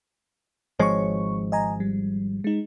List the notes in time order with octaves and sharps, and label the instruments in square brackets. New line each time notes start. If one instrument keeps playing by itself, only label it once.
[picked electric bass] G#1 F3 G#3 [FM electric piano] C#5 C#6
[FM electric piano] D#5 G#5 A#5
G3
G#3 D#4